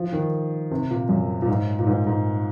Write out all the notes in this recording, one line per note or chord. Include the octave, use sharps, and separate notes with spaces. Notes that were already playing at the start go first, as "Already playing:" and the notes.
Already playing: F3
D#3
C3
A#2
F#2
A#2
G#2
A#2
G#2
G#2